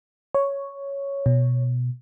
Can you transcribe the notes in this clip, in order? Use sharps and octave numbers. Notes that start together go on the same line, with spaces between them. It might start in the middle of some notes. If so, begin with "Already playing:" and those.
C#5
B2